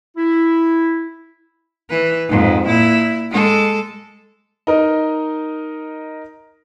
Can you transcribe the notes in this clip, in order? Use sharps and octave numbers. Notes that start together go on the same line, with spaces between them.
E4
E3 B4
F2 G#2
A#2 E4
G#3 A4
D#4 A#4 D#5